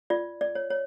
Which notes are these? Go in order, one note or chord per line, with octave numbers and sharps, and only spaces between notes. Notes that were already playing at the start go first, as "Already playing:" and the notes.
F4 D5
D5
C#5
C#5